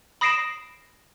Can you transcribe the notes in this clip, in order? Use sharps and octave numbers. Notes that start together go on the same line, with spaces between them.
B5 D#6 A#6 C7 D7 E7